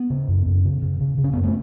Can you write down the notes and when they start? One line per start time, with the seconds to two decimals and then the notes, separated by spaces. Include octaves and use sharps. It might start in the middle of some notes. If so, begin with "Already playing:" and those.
Already playing: B3
0.10 C#3
0.28 F#2
0.46 F#2
0.64 C#3
0.82 C#3
1.00 C#3
1.18 C#3
1.24 C#4
1.33 F#2 B3
1.44 A3